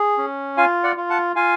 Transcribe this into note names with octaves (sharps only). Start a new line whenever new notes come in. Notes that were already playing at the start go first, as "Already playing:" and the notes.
Already playing: G#4
C#4
F4 F5 G#5
D5 F#5
F4
F#5 A5
F4 F5 G#5